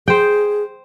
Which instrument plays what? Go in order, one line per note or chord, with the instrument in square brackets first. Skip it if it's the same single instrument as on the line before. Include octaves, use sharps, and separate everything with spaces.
[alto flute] G#4 [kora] C5 G5